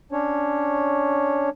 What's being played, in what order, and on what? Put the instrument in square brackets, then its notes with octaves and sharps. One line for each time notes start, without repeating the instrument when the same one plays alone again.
[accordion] C#4 D4 C#5